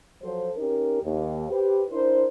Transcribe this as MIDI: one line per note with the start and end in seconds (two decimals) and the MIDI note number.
0.22 0.49 53
0.22 0.49 54
0.22 0.49 69
0.22 0.49 72
0.56 0.98 61
0.56 0.98 63
0.56 0.98 67
0.56 0.98 70
1.02 1.45 39
1.49 1.83 67
1.49 1.83 71
1.49 1.83 72
1.90 2.25 62
1.90 2.25 64
1.90 2.25 70
1.90 2.25 72